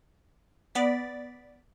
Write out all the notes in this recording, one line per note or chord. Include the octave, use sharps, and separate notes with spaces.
B3 D5 A6 B6